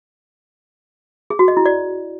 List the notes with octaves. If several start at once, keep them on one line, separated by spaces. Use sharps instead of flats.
G#4
F#4
D#5
E4
D5